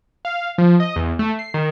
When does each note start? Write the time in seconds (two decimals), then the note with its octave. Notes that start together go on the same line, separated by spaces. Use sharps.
0.25 F5
0.58 F3
0.80 D#5
0.96 E2
1.19 A3
1.39 C7
1.54 D#3